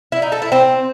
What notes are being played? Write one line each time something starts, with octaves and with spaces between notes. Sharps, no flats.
E4
D#4
A4
E4
C4